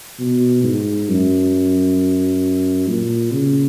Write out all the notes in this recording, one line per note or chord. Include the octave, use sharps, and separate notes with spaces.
B2
G#2
F#2
A#2
C#3